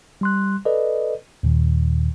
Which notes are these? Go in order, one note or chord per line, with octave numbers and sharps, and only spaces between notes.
G3 C6 F#6
A4 B4 D5 D#5
D#2 A#2 D#3